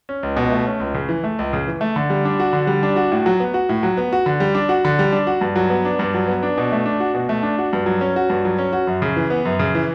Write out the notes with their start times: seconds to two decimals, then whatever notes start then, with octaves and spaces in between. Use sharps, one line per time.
0.09 C#4
0.23 C#2
0.37 B2
0.52 A3
0.67 C#4
0.80 C#2
0.94 C#3
1.09 E3
1.24 A3
1.39 C#2
1.53 C#3
1.67 E3
1.81 A3
1.96 D3
2.10 G3
2.25 D4
2.40 F#4
2.53 D3
2.67 G3
2.83 D4
2.96 F#4
3.12 A2
3.26 F#3
3.40 B3
3.54 F#4
3.69 A2
3.83 F#3
3.97 B3
4.13 F#4
4.26 D3
4.40 G3
4.55 D4
4.69 F#4
4.85 D3
4.99 G3
5.12 D4
5.27 F#4
5.41 G2
5.56 F#3
5.70 B3
5.85 D4
5.99 G2
6.14 F#3
6.28 B3
6.43 D4
6.58 B2
6.72 A3
6.86 D4
7.00 F#4
7.14 B2
7.29 A3
7.43 D4
7.58 F#4
7.73 G2
7.86 F#3
8.01 C#4
8.16 F#4
8.30 G2
8.45 F#3
8.58 C#4
8.73 F#4
8.87 F#2
9.02 C#3
9.16 E3
9.30 B3
9.45 F#2
9.59 C#3
9.75 E3